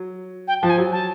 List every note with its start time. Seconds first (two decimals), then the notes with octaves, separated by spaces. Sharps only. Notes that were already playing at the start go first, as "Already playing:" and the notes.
Already playing: F#3
0.48 G5
0.62 F3 A5
0.70 G#5
0.78 F#3
0.92 A5